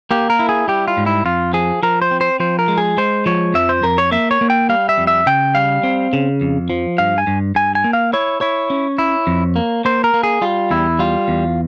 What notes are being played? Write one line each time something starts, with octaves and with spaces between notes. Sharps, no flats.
A#3 G4
A#4
E4
G#4
G3 G4
F4
G#2
E4
F2 F4
F3 G#4
F3 A#4
C5
C4
C5
F3 C5
A#4
G#3
G#4
G#3 C5
F3 C#5
F2 E5
C5
F2 A#4
C#5
A#3 E5
C#5
A#3
G5
G3 F5
E5
F2
E5
C#3 G5
G3 F5
C4
C#3
F2
F3
G2 F5
G#5
G2
G2 G#5
G#5
A#3
F5
E4 C#5
E4 C#5
C#4
E4
F2
A#3
A#3 C5
A#4
A#3
G#4
G3 F4
E2 E4
G3 F4
E2